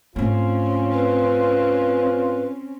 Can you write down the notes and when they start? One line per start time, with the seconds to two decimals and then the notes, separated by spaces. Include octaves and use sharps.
0.16 G#2 A3 C4 C#4 F4
0.92 B4